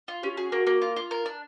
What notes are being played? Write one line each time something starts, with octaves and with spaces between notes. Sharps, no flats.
F4
C#4 G4
F#4 G#4
A#3
A#3
F4
F4
A#4
D4